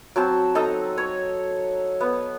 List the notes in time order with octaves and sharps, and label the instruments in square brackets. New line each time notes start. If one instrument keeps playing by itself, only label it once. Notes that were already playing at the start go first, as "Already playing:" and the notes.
[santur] F#3 C4 A5
D#4 A4 A#5
C#5
B3